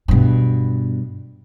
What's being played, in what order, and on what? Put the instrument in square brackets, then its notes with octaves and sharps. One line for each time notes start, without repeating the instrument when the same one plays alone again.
[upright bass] G2 B2